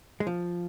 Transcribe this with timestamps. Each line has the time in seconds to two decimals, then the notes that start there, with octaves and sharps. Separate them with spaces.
0.20 G#3
0.27 F3